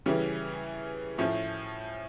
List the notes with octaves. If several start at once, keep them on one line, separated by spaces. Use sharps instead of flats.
C#3 E3 G3 C#4
A2 F3 A3 C#4